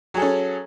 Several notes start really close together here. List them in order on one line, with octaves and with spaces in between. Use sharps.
F#3 G#4 A4 C#4